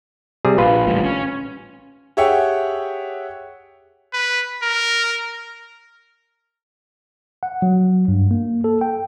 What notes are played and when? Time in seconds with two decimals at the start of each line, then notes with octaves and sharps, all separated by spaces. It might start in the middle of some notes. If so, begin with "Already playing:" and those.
0.45 C3 G3 G#4
0.58 A#1 A#2 F4 B4
0.87 A1 D2 G3
1.04 C#4
2.17 G4 G#4 C#5 E5 F#5 G5
4.13 B4
4.62 A#4
7.43 F#5
7.62 F#3
8.08 G2
8.31 A#3
8.64 A4
8.81 G5